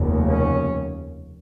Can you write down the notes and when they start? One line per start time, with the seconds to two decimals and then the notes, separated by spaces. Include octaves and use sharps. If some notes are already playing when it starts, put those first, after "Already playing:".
Already playing: F1 D#2 C#3
0.29 C#4